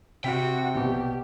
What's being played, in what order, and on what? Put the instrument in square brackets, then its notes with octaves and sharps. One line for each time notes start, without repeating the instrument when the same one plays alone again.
[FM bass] C3 [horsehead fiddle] F#4 [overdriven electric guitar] G5 [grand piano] B6
[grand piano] A#1 B2 [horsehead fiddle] G4